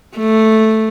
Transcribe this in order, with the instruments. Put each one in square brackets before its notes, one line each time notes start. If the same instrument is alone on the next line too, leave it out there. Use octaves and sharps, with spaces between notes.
[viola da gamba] A3